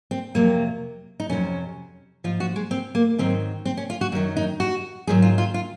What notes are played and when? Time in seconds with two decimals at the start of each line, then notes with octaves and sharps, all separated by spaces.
0.11 C4
0.35 F2 C3 F#3 A#3
1.20 D#4
1.29 F2 C3 D#3 F#3 C#4
2.24 G#2 F3 F4
2.40 F#4
2.56 G#3
2.71 C4
2.95 A#3
3.18 G#2 D#3 F#3 C4
3.65 C4
3.77 C#4
3.90 F4
4.01 F#4
4.12 F#2 D#3 F#3
4.37 D#4
4.60 F#4
5.07 G#2 D#3 F#3 G#4
5.22 F4
5.38 F4
5.54 F4